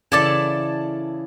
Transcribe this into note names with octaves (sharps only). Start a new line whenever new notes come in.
C#3 E3 E4 A4 D5 A5